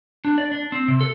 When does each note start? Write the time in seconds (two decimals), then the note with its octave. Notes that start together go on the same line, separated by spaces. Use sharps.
0.25 D4
0.38 D5
0.52 D4
0.72 C4
0.88 C3
1.01 A4